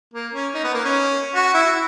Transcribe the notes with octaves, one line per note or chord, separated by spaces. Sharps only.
A#3
C#4
D#4
B3
A#3
C#4
F#4
E4